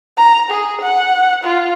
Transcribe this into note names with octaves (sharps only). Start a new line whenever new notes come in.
A#5
G#4
F#5
F4